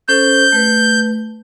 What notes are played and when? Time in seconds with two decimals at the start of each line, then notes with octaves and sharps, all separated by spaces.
0.08 C#4 A4 C5 G6
0.52 A3 B4